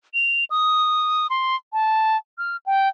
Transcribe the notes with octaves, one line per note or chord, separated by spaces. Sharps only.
F7
D#6
C6
A5
F6
G5